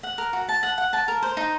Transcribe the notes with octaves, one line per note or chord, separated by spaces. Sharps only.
F#5
A#4
F#4
A5
F#5
F#5
A5
A#4
C5
D#4